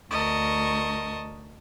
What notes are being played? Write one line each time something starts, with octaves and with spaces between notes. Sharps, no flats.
D2 A#4 D#5 A5 C#6